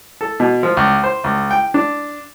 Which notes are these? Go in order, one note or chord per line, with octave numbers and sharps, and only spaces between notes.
A4
B2
F3
C#2
C5
C#2
G5
D4